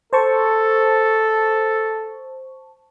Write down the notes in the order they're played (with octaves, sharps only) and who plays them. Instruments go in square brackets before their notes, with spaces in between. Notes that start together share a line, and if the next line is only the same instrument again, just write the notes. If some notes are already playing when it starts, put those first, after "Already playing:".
[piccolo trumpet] A4 [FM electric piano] C5 A5 C#6